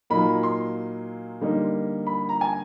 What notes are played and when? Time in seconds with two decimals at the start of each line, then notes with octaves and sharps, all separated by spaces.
0.10 A#2 F#3 A#3 D#4 B5
0.43 C6
1.41 D3 G3 A#3 D#4
2.07 B5
2.29 A#5
2.41 G#5